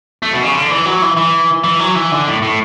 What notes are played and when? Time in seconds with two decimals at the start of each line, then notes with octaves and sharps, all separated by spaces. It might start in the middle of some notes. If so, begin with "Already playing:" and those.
0.22 A3
0.33 B2
0.43 C#3
0.55 D3
0.70 E3
0.85 F#3
1.02 E3
1.17 E3
1.64 E3
1.79 F#3
1.95 E3
2.12 D3
2.27 A2
2.42 A2